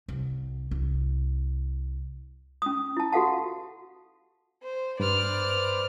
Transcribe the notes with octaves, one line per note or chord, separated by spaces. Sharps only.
C2
C2
C#4 D#6
E4 A5
F#4 G4 A4 F5 F#5 A5
C5
G2 B4 C5 D5 F6